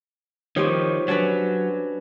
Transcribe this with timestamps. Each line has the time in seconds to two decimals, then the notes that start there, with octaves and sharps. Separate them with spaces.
0.56 D#3 F3 C4 G4 C#5
1.08 F#3 C#4 D4 B4